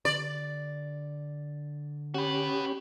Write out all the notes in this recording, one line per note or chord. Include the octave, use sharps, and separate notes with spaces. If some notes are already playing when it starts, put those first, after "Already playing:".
D3 D5
C#4 F#4 G4 B4